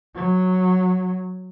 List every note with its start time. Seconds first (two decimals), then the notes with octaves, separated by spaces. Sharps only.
0.15 F#3